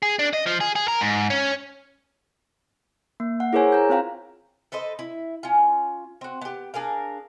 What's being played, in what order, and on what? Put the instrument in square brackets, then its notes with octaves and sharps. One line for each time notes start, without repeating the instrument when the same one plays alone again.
[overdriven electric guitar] G#4
D4
D#5
F3
G#4
G#4
A#4
G#2
C#4
[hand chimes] A#3
F#5
E4 G#4 A#4 C5 C#5 G#5
A#5 G6
C4 F4 C5 F5 G5 A#5
[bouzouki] A4 B4 C5 D#5
E4 E5
C#4 F4
C4 F#4
B3 G4
D4 G#4 A#4 F5